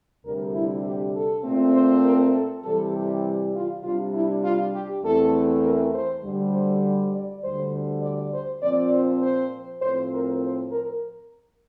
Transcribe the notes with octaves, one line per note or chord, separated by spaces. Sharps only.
D2 C3 G3 D4 A#4
E4
G4
A4
A#2 A3 C4
C5
A#4
A4
C3 E3 G3 A4
G4
F4
C3 G3 D4 F4
E4
F4
G4
E2 E3 A3 C4 A4
A#4
C5
D2 D3 G3
C5
D5
D2 D3 G3 C5
D5
C5
A#2 F3 C4 D5
C5
C5
A2 F3 C4 C5
A#4
C5
A#4